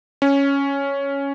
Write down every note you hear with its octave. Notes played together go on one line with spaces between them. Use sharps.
C#4